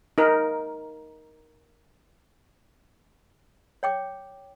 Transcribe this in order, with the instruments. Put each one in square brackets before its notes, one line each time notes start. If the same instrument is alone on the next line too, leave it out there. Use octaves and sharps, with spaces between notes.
[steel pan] D#4 A#4
[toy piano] C#5 G5 D6